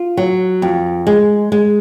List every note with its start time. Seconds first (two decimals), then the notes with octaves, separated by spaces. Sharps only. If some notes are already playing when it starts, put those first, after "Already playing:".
Already playing: F4
0.17 F#3
0.62 F2
1.07 G#3
1.52 G#3